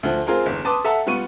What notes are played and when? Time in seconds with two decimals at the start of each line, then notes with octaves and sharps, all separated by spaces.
0.03 D2 F3
0.27 C4 F4 G#4 A#4 C6
0.46 G1 E2
0.65 B4 A5 C6 D6 D#6
0.84 A4 E5 F#5 A5 A#5
1.07 G3 B3 F4 C#6 D#7